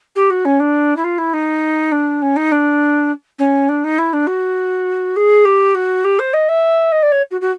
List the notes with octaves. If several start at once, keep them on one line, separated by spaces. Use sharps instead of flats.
G4
F#4
C#4
D4
E4
F4
E4
D#4
D4
C#4
D#4
D4
C#4
D4
D#4
E4
D4
F#4
G#4
G4
F#4
G4
C5
D#5
E5
D#5
D5
C#5
F#4
F#4